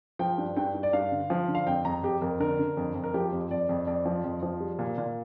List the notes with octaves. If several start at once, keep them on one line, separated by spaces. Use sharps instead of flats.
F3 G5
G2
G2 G5
G2
D5
G2 F5
D3
F3
D3
F5
F2 G5
F2 A#5
F2 G4
F2 A#4
D3 A#4
D3
F2
F2
A#4
F3 G4
F2
F2 D5
F2
F2 D5
F3
F2
F3
G3
A#2
A#2